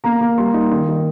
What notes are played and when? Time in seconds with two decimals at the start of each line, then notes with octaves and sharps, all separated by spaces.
0.04 A#3 A#5
0.21 A#3
0.38 G3 C6
0.54 D#4
0.71 D#3
0.89 D#3